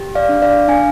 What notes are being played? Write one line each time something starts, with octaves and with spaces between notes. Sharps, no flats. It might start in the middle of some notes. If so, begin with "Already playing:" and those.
Already playing: G4
D5 F5
D4
D5 F5
D4 F5 G#5